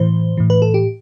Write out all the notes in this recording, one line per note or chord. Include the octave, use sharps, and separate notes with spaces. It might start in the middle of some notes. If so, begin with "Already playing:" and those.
Already playing: A2 E3 C5
A2 E3
B4
A4
G4